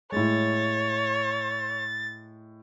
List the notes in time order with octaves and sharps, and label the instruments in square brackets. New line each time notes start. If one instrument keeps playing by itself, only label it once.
[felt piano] A2 G#3 [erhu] C#5 [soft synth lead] A6